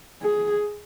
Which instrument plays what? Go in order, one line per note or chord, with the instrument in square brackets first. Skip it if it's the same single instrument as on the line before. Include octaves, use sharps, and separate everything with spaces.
[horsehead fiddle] G#4